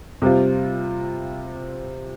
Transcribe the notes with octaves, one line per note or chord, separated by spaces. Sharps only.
C3 G3 C4 F4